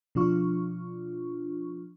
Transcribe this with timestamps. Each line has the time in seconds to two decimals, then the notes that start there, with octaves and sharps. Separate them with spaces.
0.15 B2 F3 D4 F4 C#6